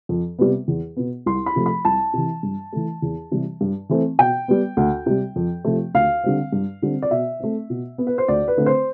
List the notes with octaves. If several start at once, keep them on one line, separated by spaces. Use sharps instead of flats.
F2
C3 G3 B3
E2
B2 B3
C2 C6
B5
C3 F3 A3
B5
C2 A5
C3 E3
G2
E3 A3
E2
C3 E3 G3
G2
E3 A3 C4
B2 G5
G3 B3
D2
C3 G3
F2
C3 F3 A3
D2 F5
D3 G3 C4
G2
D3 G3 C4
D5
B2 E5
A3 C4
B2
B3
B4
C5
D2 D5
B4
D3 A3 C4
C5